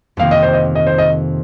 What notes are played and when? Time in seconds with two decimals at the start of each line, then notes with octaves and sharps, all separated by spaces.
0.17 F2 C3 D#3 A#3 F5
0.31 D#5
0.43 C5
0.53 D#5
0.75 D#5
0.87 C5
0.98 D#5